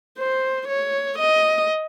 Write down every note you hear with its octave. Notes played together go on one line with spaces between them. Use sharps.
C5
C#5
D#5